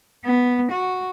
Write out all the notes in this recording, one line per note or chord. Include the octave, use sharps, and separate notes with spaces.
B3
F#4